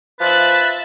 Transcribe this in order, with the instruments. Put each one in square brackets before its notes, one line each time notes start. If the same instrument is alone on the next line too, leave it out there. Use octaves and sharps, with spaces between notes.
[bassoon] F3 [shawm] B4 [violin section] E5 F#6 A6